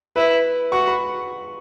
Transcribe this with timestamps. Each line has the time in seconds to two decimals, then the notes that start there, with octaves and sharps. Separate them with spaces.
0.16 E4 B4
0.72 F#4 C#6
0.88 B5